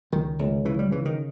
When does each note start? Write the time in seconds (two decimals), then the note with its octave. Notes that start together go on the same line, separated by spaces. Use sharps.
0.12 C#2 D#3
0.39 C#2
0.65 C#3 E3
0.79 G3
0.91 C#3 E3
1.05 D#3